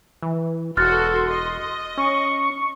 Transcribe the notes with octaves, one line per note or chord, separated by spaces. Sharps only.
E3
E1 F#4 A4 C6 F6 F#6 A6
D#5
C#4 C#6